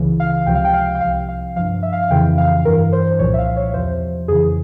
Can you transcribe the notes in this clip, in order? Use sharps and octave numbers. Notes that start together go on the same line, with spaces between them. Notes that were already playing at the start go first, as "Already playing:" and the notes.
Already playing: C#2 C#3 E3
F5
C#2 C3 F3 G5
F5
G5
F5
G5
C2 C3 F3 F5
F5
G2 F3 F5
E5
F5
F5
F2 C#3 E3 G5
F5
G2 E3 A#4
C5
C2 A#2 F3 C#5
E5
F5
C#5
E2 C3 F3 C5
F2 C#3 E3 G#4